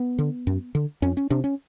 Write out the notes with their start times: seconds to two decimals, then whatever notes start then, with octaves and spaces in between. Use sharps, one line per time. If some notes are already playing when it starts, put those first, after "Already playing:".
Already playing: B3
0.19 D3
0.47 F#2
0.75 D3
1.02 F2 C#4
1.17 C#4
1.30 C3 D4
1.44 C#4